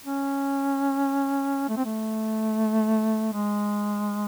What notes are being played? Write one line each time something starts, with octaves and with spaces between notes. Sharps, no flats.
C#4
A3
C4
A3
G#3